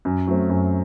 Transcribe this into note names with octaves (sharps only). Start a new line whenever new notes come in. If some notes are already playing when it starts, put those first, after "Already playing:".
F#2
F#3 A3 C4
F#2